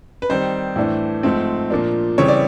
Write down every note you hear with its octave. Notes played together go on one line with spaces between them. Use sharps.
B4
D#3 G3 C4 D#4 C5
A2 E3 A3 D4
G#2 F3 A3 C4
A#2 F3 A#3 D4
C#3 E3 G3 C4 C#5
D5